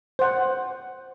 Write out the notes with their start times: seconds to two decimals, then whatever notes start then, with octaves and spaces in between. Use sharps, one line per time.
0.19 C5 F#5